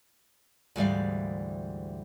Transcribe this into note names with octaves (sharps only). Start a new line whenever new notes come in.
D2 G#2 E3 G3 D5 F5